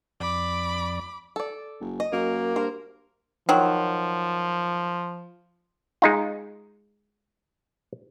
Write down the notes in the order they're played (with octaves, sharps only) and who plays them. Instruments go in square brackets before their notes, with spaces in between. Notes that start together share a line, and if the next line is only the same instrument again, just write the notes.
[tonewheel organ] F2 D5 [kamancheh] B5 D6
[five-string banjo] A4 D5
[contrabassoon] F#1
[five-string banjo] D#5
[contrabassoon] F#2 [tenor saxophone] A#3
[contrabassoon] G2 [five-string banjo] A#4 C5
[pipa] D#3 F#3 [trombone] F3
[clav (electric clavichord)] G#3 D#4 F4